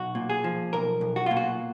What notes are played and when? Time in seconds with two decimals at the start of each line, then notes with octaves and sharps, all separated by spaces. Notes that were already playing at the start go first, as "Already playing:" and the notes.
Already playing: B1 F#4
0.15 A#2
0.30 G#4
0.44 F3
0.73 B1 A#4
1.01 B1
1.16 F#4
1.26 A#2 F4
1.37 F#4